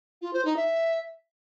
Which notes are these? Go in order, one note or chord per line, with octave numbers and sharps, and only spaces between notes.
F4
C5
D#4
E5